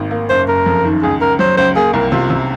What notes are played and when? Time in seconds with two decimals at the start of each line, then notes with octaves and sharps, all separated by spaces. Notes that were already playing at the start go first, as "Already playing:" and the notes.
Already playing: G#1 G#2 A#3
0.11 A#3
0.30 F#1 C5
0.48 F#1 A#4
0.66 F2
0.85 D#3
1.02 C#2 G#4
1.21 C#2 A#4
1.39 F#3 C5
1.57 C#2 C5
1.76 A#3 G#4
1.93 C2 A#4
2.12 C3 F4
2.30 C3